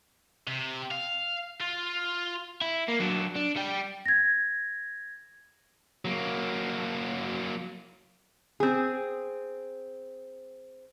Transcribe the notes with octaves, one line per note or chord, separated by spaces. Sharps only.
C3
F5
F4
E4
A#3
F#3 D4
D4
G3 G5
G#6 A#6
F#3 A#3
C4 G#4